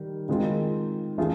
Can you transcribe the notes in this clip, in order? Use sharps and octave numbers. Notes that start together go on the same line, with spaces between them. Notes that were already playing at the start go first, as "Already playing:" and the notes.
Already playing: D#3 G3
D#3 G#3 C4 F4
E3 A3 C#4 F4 G#4